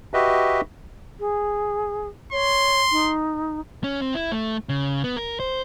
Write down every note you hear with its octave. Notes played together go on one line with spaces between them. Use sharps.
F#4 G4 B4 D#5 E5
G#4
C#5 C6
D#4
C#4
C4
E4
A3
C#3
B3
A#4
C5